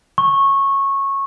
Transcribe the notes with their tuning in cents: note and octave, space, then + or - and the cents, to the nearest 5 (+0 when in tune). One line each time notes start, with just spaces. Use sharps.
C#6 -15